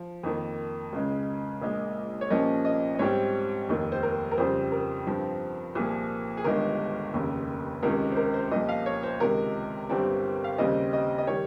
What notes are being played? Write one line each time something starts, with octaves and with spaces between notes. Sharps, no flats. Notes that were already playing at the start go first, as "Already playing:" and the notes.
Already playing: F3
F2 D#3 A#3
C#2 C#3 G#3
A#1 A#2 G#3
C#5
C2 A#2 F3 A#3 C#4 D#5
D#5
D#5
G#2 G3 C4 C#5
F1 D#2 D#3
C5
A#4
A#4
F2 C#3 G3 C4 C5
A#4
G2 F3 C4
C2 A#2 F3 G#4
G#4
G1 G2 D#3 G#3 A#4
F1 D#2 C#3
C#2 C3 D#3 G#3 C#4 A#4
C5
A#4
C5
C2 A#2 F3 D#5
F5
C#5
C5
C#2 C3 D#3 G#3 A#4
G1 G2 G3 C4
F5
D#2 C#3 G3 C4 D#5
D#5
D#5
D#3 G3 C#5